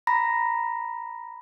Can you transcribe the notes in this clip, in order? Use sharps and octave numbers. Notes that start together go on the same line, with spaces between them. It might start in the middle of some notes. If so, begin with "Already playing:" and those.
A#5 B5 A#6